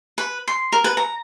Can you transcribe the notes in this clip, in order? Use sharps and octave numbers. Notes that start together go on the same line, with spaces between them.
B4
C6
A#4
B4
A#5